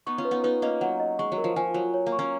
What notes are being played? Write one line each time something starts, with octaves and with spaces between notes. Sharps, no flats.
B3 D#4 C#6
C#4 F4
B4
B3 D#4
B3 D#4 B4
A#3 C#4 D#5
F#3 F#5
D#5
G#3 C#6
F#3
A#4
F3
F3 G#5
F#3 C#5
C#5
A#3
C#6
A#3 C#4